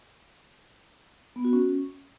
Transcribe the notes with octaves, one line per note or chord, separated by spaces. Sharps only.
B3
F#4
C#4